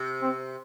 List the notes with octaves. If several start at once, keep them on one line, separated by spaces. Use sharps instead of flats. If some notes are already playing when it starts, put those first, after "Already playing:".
Already playing: C3
C4